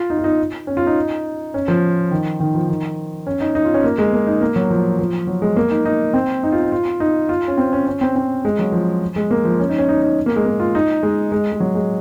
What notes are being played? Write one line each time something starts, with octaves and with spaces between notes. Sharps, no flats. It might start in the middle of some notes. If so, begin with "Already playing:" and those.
Already playing: F4
D#4
F4
D#4
C#4
F4
D#4
C#4
F3
D#3
D#3
F3
D#3
C#4
D#4
D#4
F4
C#4
A#3
G#3
A#3
D#4
A#3
F#3
F3
F3
F#3
G#3
A#3
D#4
D#4
C4
D#4
F4
D#4
F4
D#4
F4
C#4
C4
C#4
C#4
C4
C4
G#3
F#3
F3
G#3
A#3
F3
C#4
D#4
C#4
D#4
D#4
A#3
G#3
A#3
F4
D#4
G#3
G#3
G#3
F#3
G#3